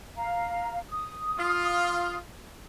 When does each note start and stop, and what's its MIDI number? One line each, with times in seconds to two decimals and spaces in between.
0.17 0.78 77
0.17 0.78 82
0.90 2.16 87
1.38 2.17 65